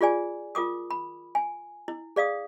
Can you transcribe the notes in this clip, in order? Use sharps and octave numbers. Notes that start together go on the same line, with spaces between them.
F4 G#4 D5 G#5
F4 A#4 D6 D#6
B5
G#5
E4
G#4 D5 F5 D#6